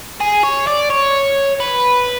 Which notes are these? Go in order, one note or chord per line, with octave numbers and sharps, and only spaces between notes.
G#4
C#5
D5
C#5
B4